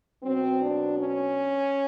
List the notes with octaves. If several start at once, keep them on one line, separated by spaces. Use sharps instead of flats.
B2 F#3 C4
D4
C#4